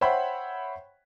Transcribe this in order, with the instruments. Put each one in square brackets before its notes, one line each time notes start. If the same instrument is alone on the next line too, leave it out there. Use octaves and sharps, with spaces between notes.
[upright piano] C5 C#5 E5 F#5 G5 B5